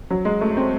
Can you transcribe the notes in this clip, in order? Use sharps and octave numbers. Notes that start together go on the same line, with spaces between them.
F#3
G#3
A3
C4